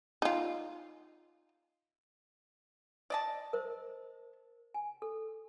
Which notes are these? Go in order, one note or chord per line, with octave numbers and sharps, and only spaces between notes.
D#4 F4
D5 D#5 A5
A#4 C5
G#5
A4